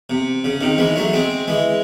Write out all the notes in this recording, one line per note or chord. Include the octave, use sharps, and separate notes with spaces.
C3
C#3
C3 D#3
E3 G#3
F#3 A3
G#3 C4
E3 G#3